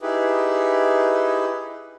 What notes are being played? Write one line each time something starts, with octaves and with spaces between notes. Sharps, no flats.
D#4 E4 G4 G#4 B4